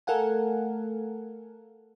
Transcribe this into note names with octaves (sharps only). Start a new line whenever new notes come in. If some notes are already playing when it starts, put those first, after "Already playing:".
A3 A4 A#4 F5 F#5 G#5